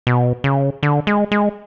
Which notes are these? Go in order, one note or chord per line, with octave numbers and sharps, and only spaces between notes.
B2
C#3
D3
G#3
G#3